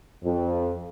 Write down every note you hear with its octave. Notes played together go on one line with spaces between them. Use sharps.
F2